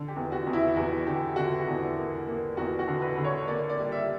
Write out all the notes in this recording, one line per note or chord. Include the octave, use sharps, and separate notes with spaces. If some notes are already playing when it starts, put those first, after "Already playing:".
Already playing: D3
G4
E2
F#4
E2
E4
E2 F#4
D3 G4
D3 F#4
E2
A#3
A#3
E2 F#4
F#4
D3
B4
D3
C#5
A#3 D5
D5
G3
E5